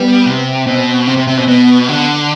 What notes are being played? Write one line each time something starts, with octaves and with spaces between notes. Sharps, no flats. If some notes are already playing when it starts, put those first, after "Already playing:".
Already playing: G3 B3
C3
B2 C4
C3 C4
C3
C3
B2 C4
B2 B3
D3